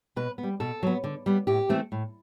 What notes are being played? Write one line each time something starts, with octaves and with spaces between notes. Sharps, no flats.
B2 B4
B3
G3
B2 A4
F#3 B3
D3
G3 B3
A2 G4
E3 A3 C4
A2